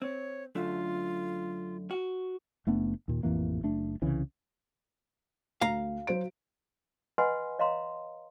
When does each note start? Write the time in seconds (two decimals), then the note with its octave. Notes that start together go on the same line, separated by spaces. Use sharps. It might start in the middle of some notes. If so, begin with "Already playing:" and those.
0.02 C4 C#5
0.55 F#2 D3 A3 F4
1.91 F#4
2.67 F#1 A3 B3 D4
3.08 D#2 A#2
3.23 A1 F2 E3 A#3
3.63 F#1 A3 D4
4.02 C2 C#3 E3
5.61 D2 F5 A#5
6.07 F#3 C5 D7
7.18 B4 D#5 F#5 G#5 B5 C6
7.59 C#5 D#5 F5 A#5 C6